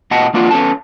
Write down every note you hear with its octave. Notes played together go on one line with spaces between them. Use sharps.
A#2 G4 D#5 F#5 A5
F2 A#3 D4 F4 F#5
B3 C#4 G#4 A4 A5